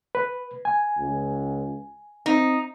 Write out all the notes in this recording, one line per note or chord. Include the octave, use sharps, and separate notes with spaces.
B4
G#5
C#2
C4 D#4